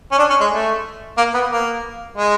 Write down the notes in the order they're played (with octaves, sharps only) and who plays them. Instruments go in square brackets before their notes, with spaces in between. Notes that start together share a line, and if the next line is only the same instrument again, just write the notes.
[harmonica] C#4
D4
C#4
G#3
A3
A#3
B3
A#3
G#3